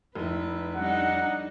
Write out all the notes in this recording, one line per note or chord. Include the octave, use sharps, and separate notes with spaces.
F1 E4 B4
G3 D4 D#4 F#5